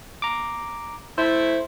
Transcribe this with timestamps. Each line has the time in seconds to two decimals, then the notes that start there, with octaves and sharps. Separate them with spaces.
0.22 A#5 D6
1.18 A3 E4 C5